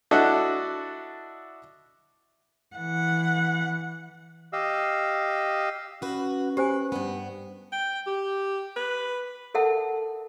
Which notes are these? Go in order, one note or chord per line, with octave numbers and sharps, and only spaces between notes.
D4 E4 F#4 A4 D#5
E3 F#5
G4 D#5 F5 E6
C#4 F#4 B4
G4 B4 C5 G#5
G2 B3
G5
G4
B4
A4 A#4 E5 F#5 A5